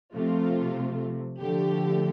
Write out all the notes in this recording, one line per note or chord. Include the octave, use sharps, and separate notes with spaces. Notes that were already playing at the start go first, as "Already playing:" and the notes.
C3 F3 A3 F4
D3 F3 A3 G4